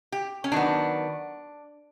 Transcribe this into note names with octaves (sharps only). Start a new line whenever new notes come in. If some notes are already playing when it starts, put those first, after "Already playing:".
G4
C#4
D#3 F#3 B3 D4